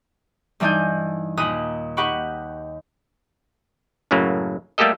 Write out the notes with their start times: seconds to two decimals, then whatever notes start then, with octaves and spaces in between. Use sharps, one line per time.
0.60 G2 E3 D4 D#4 G#5 G6
1.37 D#2 A#2 A#5 B5 D#6 F#6
1.97 D#4 G4 F#5 B5 C#6
4.11 F#2 A2 C#3 F#3 A#3
4.78 G3 A3 A#3 G4 A4 D#5